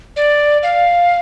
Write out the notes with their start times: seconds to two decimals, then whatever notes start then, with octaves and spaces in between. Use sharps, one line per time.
0.16 D5
0.63 F5